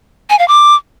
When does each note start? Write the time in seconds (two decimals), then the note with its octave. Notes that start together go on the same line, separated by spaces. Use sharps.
0.30 G#5
0.39 F5
0.48 D6